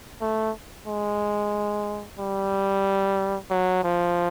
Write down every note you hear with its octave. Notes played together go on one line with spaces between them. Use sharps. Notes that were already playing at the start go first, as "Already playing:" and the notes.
A3
G#3
G3
F#3
F3